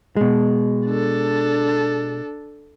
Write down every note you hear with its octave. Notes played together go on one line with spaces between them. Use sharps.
B2 G#3
D4 A4